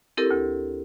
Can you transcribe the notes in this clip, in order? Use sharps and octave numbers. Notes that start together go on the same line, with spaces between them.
C4 E4 G4 A4 A#4
D2